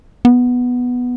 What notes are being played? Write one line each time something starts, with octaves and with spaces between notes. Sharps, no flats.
B3